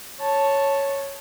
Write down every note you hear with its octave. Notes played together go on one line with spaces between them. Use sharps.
C#5 A5